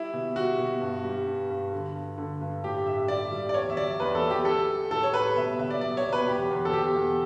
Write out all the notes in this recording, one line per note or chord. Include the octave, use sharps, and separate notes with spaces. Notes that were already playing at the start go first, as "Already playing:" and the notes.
Already playing: G3 E4
B2
G3 F#4
B2
G2
G3
G2
G2
D3
G2
D3
G2
A2 G4
G3 E5
G3 D5
G3
D5
E2 C#5
E5
F#3 D5
E2 B4
A4
E2
G4
G3 A4
G3
A2 A4
C#5
G3 B4
B2 E5
B2 E5
D5
F#3 D5
C#5
B2
B4
E2 G4
E2
A4
B2 G4
E2